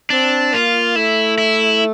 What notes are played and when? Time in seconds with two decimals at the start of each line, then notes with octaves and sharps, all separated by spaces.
0.10 C4 D4
0.53 A#3 F4
0.96 A3 E4
1.38 E4